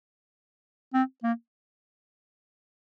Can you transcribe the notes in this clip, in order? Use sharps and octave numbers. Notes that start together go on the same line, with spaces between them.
C4
A#3